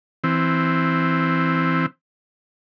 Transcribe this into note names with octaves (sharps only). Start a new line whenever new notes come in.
E3 C4